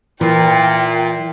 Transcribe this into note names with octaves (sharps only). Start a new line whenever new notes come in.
A#2 E3 G5